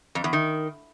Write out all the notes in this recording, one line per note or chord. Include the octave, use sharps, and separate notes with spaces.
F2
E2
D#3